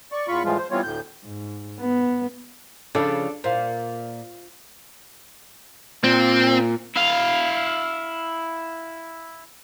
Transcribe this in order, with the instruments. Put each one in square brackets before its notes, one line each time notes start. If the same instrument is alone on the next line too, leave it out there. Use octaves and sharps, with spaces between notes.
[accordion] D5 C#6
E2 F4 B5 C#6
A2 E3 F3 G3 G#3 F4
C5
E3 G3 B3 C4 F4 C#5
D2 A2 G6
[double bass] G#2
B3
[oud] C#3 F3 [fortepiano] D4 A4 D5
[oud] A#2 [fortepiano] C5 F5
[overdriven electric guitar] A#2 [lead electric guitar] C4
[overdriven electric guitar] E4 F5